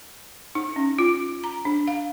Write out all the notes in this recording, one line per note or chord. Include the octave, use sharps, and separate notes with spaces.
D#4
C#4
F4
A#5
D4
F5